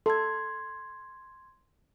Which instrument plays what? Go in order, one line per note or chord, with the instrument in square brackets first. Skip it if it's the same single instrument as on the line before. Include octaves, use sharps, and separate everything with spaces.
[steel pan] A4 [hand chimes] C6 G#6